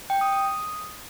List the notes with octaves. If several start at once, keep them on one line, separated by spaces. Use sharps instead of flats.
G5
D#6
D#6